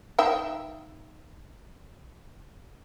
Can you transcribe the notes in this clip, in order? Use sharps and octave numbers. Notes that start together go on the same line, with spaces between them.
D#4 E5 G5